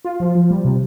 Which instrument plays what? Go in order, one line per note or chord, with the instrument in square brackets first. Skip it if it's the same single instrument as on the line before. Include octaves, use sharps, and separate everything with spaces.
[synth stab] F4
F3
F3
G3
C3